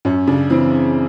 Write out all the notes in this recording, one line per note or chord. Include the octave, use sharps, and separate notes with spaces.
F#2 C#4
C#3 D4
E3 C4